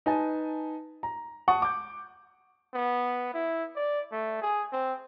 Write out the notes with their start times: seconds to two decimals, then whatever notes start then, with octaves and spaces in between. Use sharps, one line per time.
0.06 D#4 B4 G#5 A5
1.03 A#5
1.48 F#5 A5 C#6 D#6
1.62 D6 G6
2.74 B3
3.34 E4
3.76 D5
4.12 A3
4.42 G#4
4.73 C4